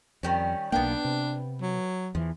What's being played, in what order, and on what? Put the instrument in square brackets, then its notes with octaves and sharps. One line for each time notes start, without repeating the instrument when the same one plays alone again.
[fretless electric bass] F2 [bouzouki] D#3 G3 C#4
[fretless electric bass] B1 F2 A#3 [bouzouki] B3 G5 [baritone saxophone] D4
[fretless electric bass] C3
[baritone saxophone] F#3
[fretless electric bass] E2 E3 [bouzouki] F3